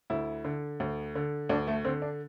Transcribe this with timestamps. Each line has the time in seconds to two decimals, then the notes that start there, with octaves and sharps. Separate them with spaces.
0.10 D2 E4
0.44 D3
0.80 D2
1.15 D3
1.49 D2 D4
1.67 A3
1.84 D3 C4
2.02 D4